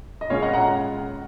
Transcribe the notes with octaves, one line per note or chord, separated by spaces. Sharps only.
D#5
A#2 G#3 C#4 F4 C#5 F5
D#5 F#5
F#5 A#5